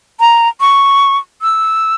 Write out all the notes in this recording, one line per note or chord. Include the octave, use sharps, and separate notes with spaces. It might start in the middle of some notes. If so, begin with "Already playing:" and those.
A#5
C#6
E6